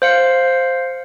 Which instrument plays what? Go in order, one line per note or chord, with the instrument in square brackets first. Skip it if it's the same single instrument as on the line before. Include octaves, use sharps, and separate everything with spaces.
[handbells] C5 F5 C#7